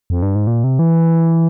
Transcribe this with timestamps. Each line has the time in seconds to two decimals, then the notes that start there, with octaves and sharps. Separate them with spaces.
0.10 F2
0.22 G2
0.35 G#2
0.47 A#2
0.64 C3
0.79 E3